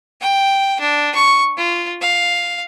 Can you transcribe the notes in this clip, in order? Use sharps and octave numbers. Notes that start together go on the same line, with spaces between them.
G5
D4
C#6
F4
F5